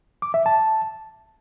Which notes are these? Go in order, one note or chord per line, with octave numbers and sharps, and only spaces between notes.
D6
E5
A5